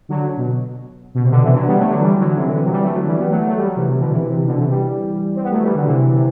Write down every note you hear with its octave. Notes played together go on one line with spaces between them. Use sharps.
D3 F#3
B2
B2
C3
B2 D3
C3 E3
D3 F#3
G3 B3
F#3 A3
D3 F#3
E3 G3
D3 F#3
C3 E3
D3
C3 E3
F#3
E3 G3
F#3 A3
D3 F#3
E3 G3
G3 B3
F#3 A3
A3
G3
F#3
C3 E3
C3
B2 D3
C3 E3
C3
B2 D3
C3 E3
E3 G3
C4
B3
F#3 A3
E3 G3
D3 F#3
C3 E3
C3